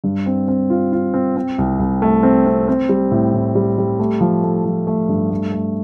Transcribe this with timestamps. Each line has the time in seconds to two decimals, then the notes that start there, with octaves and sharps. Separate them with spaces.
0.04 G2
0.26 C4
0.48 C4
0.70 F4
0.92 F4
1.14 C4
1.36 C4
1.58 C2
1.79 C2
2.02 A3
2.23 C4
2.46 C4
2.68 C4
2.89 G3
3.11 A2
3.34 A2
3.55 G3
3.78 G3
3.99 A3
4.21 F3
4.44 A3
4.65 F3
4.87 A3
5.09 G2
5.30 A3
5.52 A3